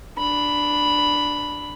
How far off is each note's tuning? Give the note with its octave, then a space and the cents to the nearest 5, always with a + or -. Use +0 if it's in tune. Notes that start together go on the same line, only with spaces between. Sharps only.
D4 +0 B5 +0